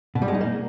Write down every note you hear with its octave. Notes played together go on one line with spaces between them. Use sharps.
B2
G3
G#3
D#4
A#3